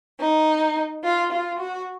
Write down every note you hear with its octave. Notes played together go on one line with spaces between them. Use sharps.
D#4
F4
F4
F#4